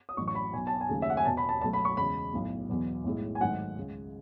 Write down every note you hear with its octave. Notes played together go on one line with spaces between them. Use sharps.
D#6
A1 A2 F#3 C#6
C#6
B5
B1 B2 F#3 G#5
A5
G#5
D#2 C#3 F#3 A3
E5
F#5
G#5
E1 E2 B2 A5
B5
A5
C#2 B2 F#3 A3 A5
B5
C#6
E2 C#3 G#3 B5
B1 A2 F#3
E2 B2 F#3
B1 A2 G#3
G#5
G#1 G#2 F#3 A3 F#5
C#2 C#3 G#3